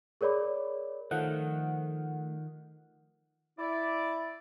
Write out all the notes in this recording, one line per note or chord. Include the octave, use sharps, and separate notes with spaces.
G#4 A#4 C#5 D5 B5 D6
D#3 F3 A3 F#5
E4 D5